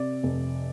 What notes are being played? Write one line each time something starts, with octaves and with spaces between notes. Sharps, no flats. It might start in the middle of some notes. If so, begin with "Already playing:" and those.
Already playing: C3 D5
F1